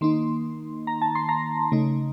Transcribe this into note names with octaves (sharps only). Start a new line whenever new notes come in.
D#3 A#3 D#4 C6
A#5
A5
C6
A#5
C#3 A3 D#4